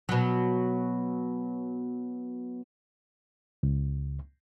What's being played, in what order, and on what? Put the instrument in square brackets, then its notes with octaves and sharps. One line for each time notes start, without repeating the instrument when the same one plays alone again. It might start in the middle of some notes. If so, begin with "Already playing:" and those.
[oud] B2 F#3
[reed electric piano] C#2